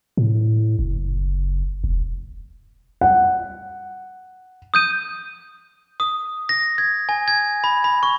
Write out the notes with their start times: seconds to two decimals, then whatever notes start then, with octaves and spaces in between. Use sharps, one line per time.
0.17 A2
0.79 F#1
1.84 E1
3.01 F#5
4.74 D#6 G6 D#7
6.00 D#6
6.49 A#6
6.78 G#6
7.09 G#5
7.28 G#6
7.64 B5
7.84 B5
8.03 C#6